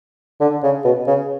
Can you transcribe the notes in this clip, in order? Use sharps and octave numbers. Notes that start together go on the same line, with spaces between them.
D3
C#3
B2
C#3